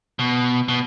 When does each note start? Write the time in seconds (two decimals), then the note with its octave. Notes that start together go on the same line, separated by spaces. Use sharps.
0.19 B2
0.68 B2